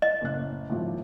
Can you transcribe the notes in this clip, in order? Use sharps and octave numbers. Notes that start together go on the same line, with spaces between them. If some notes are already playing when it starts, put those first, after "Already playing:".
D#5
F#1 A2 F#6
G#1 A2 F3